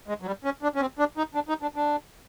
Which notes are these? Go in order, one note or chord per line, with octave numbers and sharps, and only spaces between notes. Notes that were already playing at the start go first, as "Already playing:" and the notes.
G#3
F#3
G3
C#4
D4
C#4
C4
D4
D#4
D4
D#4
D4
D4